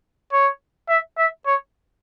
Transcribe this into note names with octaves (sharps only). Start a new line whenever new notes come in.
C#5
E5
E5
C#5